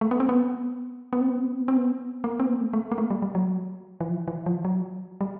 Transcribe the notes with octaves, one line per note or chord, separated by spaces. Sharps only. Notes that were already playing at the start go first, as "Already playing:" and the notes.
A3
B3
C4
B3
B3
C4
B3
C4
B3
C4
B3
C4
B3
A#3
C4
B3
A#3
A3
A3
A#3
A3
G3
G3
F#3
E3
F3
E3
F3
F#3
G3